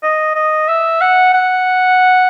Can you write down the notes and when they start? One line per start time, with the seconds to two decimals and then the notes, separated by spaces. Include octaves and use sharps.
0.03 D#5
0.35 D#5
0.68 E5
1.01 F#5
1.34 F#5